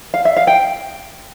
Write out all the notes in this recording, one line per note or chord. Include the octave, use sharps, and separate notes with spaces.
F5
E5
F5
G5